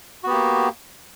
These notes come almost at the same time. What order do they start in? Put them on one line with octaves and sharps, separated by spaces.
F#4 B3 G4 A#3